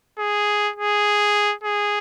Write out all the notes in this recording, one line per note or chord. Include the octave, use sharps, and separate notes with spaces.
G#4
G#4
G#4